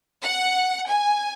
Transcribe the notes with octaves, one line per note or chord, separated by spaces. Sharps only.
F#5
G#5